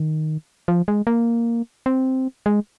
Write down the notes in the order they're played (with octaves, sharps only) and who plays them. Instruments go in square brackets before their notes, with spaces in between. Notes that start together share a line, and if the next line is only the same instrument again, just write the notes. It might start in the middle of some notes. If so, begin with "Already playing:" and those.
Already playing: [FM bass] D#3
F3
G#3
A#3
C4
G#3